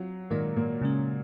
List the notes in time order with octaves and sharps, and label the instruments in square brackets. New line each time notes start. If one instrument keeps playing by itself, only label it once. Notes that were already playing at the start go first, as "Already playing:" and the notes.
Already playing: [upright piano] F#3 [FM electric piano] C4 F4
[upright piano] A#2 A#3 [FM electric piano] D#3 G#3 D#4 F#4
[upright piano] A#2 A#3
[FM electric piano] C#3 G#3 C#4